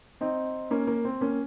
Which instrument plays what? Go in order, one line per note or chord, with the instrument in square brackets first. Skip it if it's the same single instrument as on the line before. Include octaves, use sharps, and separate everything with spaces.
[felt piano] C4 D#4
A#3 C#4
A#3
C4
A#3 C#4